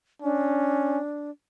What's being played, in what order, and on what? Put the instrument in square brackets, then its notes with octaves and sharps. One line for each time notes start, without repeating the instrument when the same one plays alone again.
[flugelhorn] C#4 [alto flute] D4